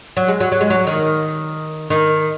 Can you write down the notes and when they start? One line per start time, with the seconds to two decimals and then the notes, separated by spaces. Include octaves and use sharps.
0.17 F#3
0.28 G#3
0.40 F#3
0.52 F#3
0.61 G#3
0.70 F#3
0.87 D#3
1.90 D#3